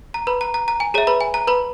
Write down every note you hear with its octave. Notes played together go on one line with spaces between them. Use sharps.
A#5
B4 B5
A#5
A#5
A#5
G#5
G#4 C#5 E5 A#5
B4 B5
G#5
A#5
B4 B5